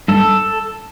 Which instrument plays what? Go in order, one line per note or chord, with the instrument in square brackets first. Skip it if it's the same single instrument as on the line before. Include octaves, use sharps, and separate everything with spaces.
[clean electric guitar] G2 [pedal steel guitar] A4